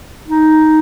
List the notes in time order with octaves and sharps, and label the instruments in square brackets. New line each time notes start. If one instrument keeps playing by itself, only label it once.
[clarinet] D#4